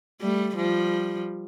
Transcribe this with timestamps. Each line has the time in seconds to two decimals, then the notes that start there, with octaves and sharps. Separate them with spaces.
0.21 G3 A3
0.56 F3 G3